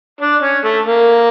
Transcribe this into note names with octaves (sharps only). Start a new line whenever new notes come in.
D4
C#4
A3
A#3